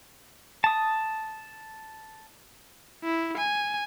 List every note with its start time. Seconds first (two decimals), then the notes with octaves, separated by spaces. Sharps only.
0.64 A5 D#6
3.04 E4
3.38 G#5